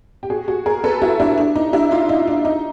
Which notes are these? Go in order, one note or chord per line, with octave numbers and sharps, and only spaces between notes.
G4
F#4 G#4
F#4 G#4
G#4 A#4
A4 B4
E4 F#4
D4 E4
D4
D#4
D4 E4
D#4 F4
D#4
D4
D#4